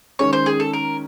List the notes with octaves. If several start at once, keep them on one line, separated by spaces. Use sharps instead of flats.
D#3 G#3 C#4 C#5
C5
G#4
A4
A#4